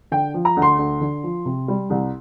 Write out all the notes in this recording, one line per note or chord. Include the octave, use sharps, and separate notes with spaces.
D3 G5
F3
A#5
D2
C6
D2
D3
F3
C3
G3
C2